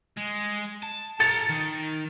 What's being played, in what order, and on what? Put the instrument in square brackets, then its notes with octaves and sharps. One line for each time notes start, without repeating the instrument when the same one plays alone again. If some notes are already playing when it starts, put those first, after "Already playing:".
[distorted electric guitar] G#3
A5
[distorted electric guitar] A4 A#5 [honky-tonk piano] A6 C#7
[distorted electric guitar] D#3